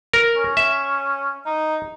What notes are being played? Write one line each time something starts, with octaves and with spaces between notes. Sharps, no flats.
A#4
C#4
E5
D#4